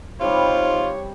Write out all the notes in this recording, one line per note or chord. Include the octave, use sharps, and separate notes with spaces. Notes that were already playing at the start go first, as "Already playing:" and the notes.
C3 G3 D#4 F4 C5 C#5